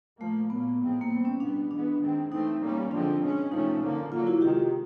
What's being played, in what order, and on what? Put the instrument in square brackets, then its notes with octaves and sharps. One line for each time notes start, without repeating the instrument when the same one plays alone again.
[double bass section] A#2 F3 A#3 [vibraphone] A3
[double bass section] A#2 F#3 A#3 [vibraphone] B3
[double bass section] A2 F3 G#3 C4
[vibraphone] A#3
[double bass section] E3 G3 C4 [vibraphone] B3
[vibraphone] C#4
[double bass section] B2 G3 B3 [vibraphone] D4
[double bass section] E3 G#3 B3 [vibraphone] D4
[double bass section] D#3 G#3 C4
[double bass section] E3 A3 C4 [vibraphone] D#4
[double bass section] B2 G3 A#3 C#4
[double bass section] D3 F3 G#3 C4 [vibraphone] D4
[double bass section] B2 G#3 C#4
[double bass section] C3 F3 A3 C#4 [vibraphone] D#4
[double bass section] D3 F3 A#3
[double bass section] D3 F#3 A#3 [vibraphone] F4
[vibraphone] E4 F#4
[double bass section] C3 D#3 G#3 [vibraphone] F4 G4